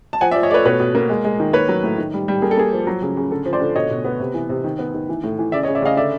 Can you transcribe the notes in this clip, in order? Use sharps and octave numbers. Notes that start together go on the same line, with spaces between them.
A5
F3 F#5 G#5
D5 E5
F3
C#5 D#5
A3 B4 C#5 D5
B2 B4 C#5
B2
A#3
G#3
G#3
D#3
A#3 B4 C#5
F#3
A2
D#3
G3
G3
A#3 G#4
A4
A#3 G#4
F3
F#3
C#3
C#3
D3 A4
F3
C5 D5
D3
B2 C#5 D#5
B2
B3
C3
E3
C3
D#3
B3
D#3
E3
A2
E3
C#3 D5 E5
C#5 D#5
C#3
D5 E5
C#3 D#5 F5
D3 D5 E5